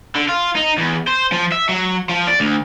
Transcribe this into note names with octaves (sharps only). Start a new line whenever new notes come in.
D3
F4
D#4
E2
C5
F3
E5
F#3
F3
D5
D2